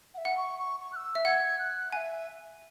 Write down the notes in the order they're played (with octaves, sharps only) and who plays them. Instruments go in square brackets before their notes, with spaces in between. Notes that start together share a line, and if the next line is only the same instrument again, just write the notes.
[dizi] F#5
E5
[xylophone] F#5
[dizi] C#6
C#6
C#6
F#6
E6
[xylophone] E5
[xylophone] F#5 [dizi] G#6
[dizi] F#6
[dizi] E5 F#5 [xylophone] G#5